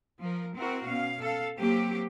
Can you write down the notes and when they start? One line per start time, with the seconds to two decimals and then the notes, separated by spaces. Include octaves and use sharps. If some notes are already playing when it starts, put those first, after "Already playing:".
0.20 F3 A#4
0.55 C4 E4 F#4 A#4
0.84 B2 C#4 F5
1.21 A4 F5
1.56 F#3 A#3 C4 G4